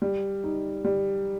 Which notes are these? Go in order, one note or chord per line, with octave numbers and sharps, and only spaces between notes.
G3
D#4
G3